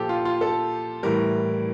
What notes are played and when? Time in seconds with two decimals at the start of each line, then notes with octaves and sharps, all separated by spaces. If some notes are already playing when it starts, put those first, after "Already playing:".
Already playing: A#2 F3 G4 A4
0.09 F4
0.25 F4
0.41 A4
1.03 A2 E3 G3 A#4